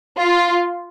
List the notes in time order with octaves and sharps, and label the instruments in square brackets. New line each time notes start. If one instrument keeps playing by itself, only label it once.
[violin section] F4